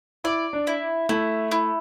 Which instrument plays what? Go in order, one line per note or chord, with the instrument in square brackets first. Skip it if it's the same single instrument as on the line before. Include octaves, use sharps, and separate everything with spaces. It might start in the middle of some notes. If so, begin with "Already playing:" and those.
[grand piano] E4 [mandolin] D5
[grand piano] D4
[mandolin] E4
[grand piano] A3 [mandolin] E4
[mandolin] E4